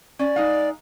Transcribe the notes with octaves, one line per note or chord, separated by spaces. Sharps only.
C#4 D5
G#3 D#4 F5